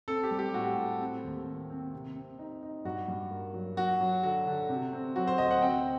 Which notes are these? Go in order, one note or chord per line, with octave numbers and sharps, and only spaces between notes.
C4 A4
G4
G3
G4
A2 F#4
A2
C4
D#2
C4
C4
C3
C4
D#4
D#4
G2 F#4
G2
A#3
F#3
F#3 F#4
F#3
D3 F#4
D3
C3
C4
F#3 F#4
C5
D2 D#5
F#5
C4 G5